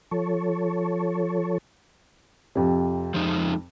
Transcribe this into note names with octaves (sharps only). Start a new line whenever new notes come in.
F3 A4 C#5
F2 C3
F3 G#3 D#4